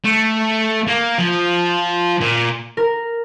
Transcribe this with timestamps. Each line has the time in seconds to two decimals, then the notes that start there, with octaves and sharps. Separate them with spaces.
0.04 A3
0.87 A#3
1.18 F3
2.21 A#2
2.77 A#4